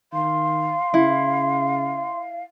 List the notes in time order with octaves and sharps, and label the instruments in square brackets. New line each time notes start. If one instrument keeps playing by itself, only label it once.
[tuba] D#3 [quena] F5 [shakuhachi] C6
[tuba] C#3 [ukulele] E4